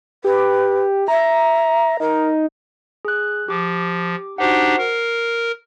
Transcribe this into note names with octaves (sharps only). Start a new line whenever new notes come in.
G4 B4
E5 A#5
D#4 A#4
G#4 F#6
F3 G4 D6
D4 D#4 F#4 G4 C5 F#5
A#4 C7